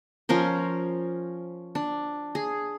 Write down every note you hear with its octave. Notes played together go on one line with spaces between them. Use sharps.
F3 C#4 A#4 C5
D4
G#4